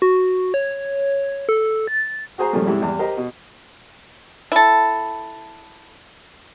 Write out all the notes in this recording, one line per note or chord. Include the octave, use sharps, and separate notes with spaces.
F#4
C#5
A4
A6
F#4 G#4 C5 G#5 A#5
G2 A#2 C#3 F3 G3 A3
G#2 C3 G3 E4
E2 G3
G4 A#4 C5 D#5
B2
E4 A4